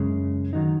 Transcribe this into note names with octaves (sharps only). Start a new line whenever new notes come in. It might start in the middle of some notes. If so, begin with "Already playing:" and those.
Already playing: F#2 C#3 G#3
D#3 F#3 D#4